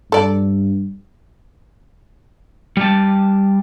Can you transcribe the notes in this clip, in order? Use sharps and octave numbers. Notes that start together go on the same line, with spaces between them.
G2 A4 D5
G3 A5